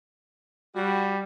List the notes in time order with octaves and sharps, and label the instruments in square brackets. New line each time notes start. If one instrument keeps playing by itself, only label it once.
[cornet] G3 [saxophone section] F#4